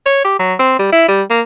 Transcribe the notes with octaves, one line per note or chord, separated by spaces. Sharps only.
C#5
G4
F#3
C4
G3
E4
G3
A#3